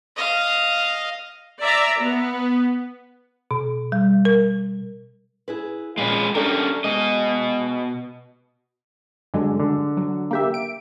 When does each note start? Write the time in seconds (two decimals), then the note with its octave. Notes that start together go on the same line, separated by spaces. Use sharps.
0.17 D#5 F5
1.61 D5 E5 A#5
2.00 B3
3.51 B2
3.92 G3
4.25 A#4
5.48 E4 G#4 B4
5.98 A#2 F3 G#3 C#4 B4
6.35 C#4 D4 G4 A4 A#4
6.84 B2 G#3 D#5
9.34 G2 D3 F#3 G#3
9.60 D3
9.97 F#3
10.31 A#3 G4 E5
10.54 D7